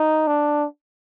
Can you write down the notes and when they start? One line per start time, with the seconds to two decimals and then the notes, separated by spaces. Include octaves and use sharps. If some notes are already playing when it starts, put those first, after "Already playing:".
Already playing: D#4
0.27 D4